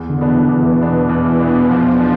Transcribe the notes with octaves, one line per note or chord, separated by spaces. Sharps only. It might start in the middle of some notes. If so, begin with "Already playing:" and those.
Already playing: E2
D3
B2 B3 D4
E3
D3
E2 E3
B2 B3 D4
E2
B2 B3 D4
E2 F3
D4